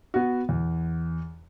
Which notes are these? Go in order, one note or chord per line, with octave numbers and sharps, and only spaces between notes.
B3 F#4
E2